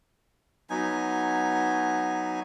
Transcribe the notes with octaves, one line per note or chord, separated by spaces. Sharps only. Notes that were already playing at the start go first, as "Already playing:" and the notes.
F#3 B3 D#4 G#5